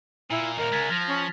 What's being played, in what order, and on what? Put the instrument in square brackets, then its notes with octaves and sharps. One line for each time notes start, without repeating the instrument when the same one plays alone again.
[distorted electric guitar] A#2 [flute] E4
[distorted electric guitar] D#2 A#2 [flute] A#4
[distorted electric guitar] C#3 G#3 [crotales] G#6 A6 B6
[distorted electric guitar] F3 [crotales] F6 A#6 F7
[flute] C#4